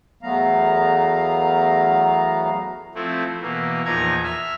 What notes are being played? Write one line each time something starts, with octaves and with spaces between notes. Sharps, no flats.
E2 F#3 A3 B3 F5 A#5
F3 A3 C4 E4
B2 E3 A#3
E2 A#2 F3 D#4 A#5 G#6
E5 F6